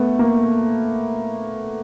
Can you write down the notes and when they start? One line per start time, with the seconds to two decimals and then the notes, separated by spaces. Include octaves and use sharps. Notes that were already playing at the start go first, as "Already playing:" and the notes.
Already playing: A3 B3
0.19 A#3